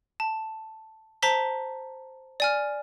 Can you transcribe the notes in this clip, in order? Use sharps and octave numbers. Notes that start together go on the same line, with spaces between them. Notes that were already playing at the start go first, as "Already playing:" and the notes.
A5
C5 A5 A#5 B6 G7
D5 G#5 F6